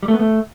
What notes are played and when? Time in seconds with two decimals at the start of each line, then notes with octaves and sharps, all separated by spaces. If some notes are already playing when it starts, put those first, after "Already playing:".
0.03 G3
0.08 A3
0.14 B3
0.19 A3